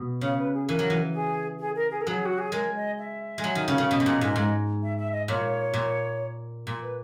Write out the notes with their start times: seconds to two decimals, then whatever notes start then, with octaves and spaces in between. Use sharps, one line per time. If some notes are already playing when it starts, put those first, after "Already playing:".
Already playing: B2
0.21 C#3 C#5
0.37 B4
0.53 G#4
0.68 E3 A#4
0.79 F#3
0.90 E3
1.13 G#4
1.59 G#4
1.76 A#4
1.91 G#4
2.01 A#4
2.07 F#3 G#4
2.25 F#4
2.38 G#4
2.52 G#3 A#4
2.75 D#5
2.98 E5
3.38 G#3
3.44 F#3
3.55 D#3
3.68 C#3
3.78 C#3
3.90 B2 D#5
4.00 B2
4.06 A#2
4.21 G#2
4.36 G#2
4.83 E5
4.98 E5
5.12 D#5
5.28 A#2 C#5
5.74 A#2
6.67 A#2
6.82 B4